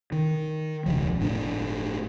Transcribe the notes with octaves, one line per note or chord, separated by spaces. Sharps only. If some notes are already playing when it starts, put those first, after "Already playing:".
D#3
E1 C#2 F3
G1 A2 D4